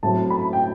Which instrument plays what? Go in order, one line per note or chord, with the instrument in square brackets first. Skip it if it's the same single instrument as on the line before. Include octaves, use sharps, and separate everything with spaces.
[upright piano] A2 F#3 C4 A5
B5
G5